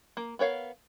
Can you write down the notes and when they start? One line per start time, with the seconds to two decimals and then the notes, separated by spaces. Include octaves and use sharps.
0.17 A#3
0.39 B3 A#4 C#5 F5